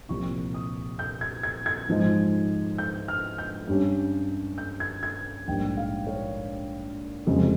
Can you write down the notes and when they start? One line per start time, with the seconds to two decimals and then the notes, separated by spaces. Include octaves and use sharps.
0.09 C2 A#2 F3 C#6
0.54 D#6
0.99 G6
1.21 G#6
1.43 G#6
1.66 G#6
1.88 G#2 F3 G#3 D#4
2.78 G6
3.08 F6
3.38 G6
3.68 G2 G3 C#4
4.58 G6
4.80 G#6
5.03 G#6
5.48 A#1 G#2 G3 G5
5.77 F5
6.07 C#5
7.26 F1 F2 C#3 F3 G#3